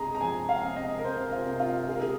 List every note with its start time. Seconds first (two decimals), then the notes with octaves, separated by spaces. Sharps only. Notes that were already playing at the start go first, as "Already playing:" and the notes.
Already playing: C3 G#3 G#4 A#5
0.15 A#5
0.21 F3 G#5
0.49 F5
0.63 C3
0.76 D#5
0.99 A#4
1.04 C3 C5
1.32 F4
1.46 C3
1.60 F4
1.87 G#3 G#4
1.95 A#4
2.01 G#4